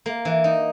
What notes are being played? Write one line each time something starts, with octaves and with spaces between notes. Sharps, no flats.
A#3
E3
D#4